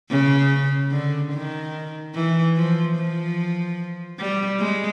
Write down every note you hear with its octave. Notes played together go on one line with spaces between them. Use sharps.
C#3
D3
D#3
E3
F3
F3
G3
G#3